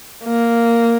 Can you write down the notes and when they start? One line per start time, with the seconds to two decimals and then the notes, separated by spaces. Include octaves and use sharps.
0.24 A#3